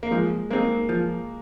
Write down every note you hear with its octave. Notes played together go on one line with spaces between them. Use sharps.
A#3
F3 G#3
G#3 A#3 C4 D#4
F3